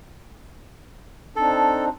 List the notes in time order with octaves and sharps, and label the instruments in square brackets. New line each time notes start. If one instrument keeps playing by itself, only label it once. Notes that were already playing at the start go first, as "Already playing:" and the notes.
[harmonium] C4 D4 D#4 [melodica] A4